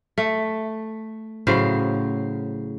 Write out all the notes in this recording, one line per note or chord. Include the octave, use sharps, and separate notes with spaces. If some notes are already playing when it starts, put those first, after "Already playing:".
A3
A2 C#3 F#3 C5